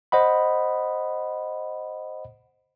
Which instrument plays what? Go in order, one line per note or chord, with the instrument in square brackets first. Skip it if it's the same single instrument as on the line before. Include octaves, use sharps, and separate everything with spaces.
[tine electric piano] C5 D#5 F#5 B5